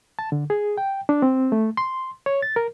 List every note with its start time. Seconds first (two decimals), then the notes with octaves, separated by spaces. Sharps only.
0.19 A5
0.32 D3
0.50 G#4
0.78 G5
1.09 D4
1.22 C4
1.52 A3
1.77 C6
2.26 C#5
2.42 A6
2.56 A#4